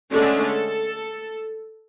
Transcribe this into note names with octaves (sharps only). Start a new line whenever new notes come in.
D3 G#3 A3 C#4 D4
A4